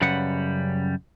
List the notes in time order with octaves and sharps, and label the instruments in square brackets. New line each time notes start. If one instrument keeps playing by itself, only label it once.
[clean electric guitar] F#2 C#3 G3 B4 F#5